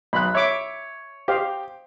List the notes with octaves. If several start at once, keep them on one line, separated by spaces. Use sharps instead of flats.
B1 D#5 B5 F#6
C#5 E5 D6
G4 C5 D#5 F5